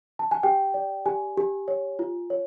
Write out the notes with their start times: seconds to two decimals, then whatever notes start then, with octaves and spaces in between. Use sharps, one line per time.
0.19 A5
0.31 G#5
0.43 G4 G5
0.74 D5
1.06 G4 G#5
1.38 G4
1.68 C#5
1.99 F4
2.30 C#5